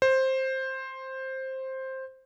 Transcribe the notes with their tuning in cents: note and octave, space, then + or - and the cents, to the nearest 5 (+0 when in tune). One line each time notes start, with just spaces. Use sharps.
C5 +10